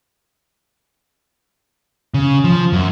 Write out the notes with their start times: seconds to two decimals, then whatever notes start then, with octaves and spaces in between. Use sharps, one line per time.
2.14 C#3
2.44 F3
2.73 F#2